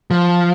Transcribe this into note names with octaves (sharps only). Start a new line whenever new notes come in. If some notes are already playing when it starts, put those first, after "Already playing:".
F3